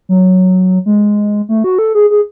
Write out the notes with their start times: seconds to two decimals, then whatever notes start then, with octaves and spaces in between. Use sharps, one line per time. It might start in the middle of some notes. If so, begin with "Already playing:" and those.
0.09 F#3
0.86 G#3
1.49 A3
1.64 F#4
1.79 A4
1.95 G#4
2.10 G#4